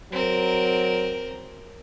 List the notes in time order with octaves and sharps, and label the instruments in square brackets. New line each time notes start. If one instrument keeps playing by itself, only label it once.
[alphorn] F#3 [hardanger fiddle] C4 A#4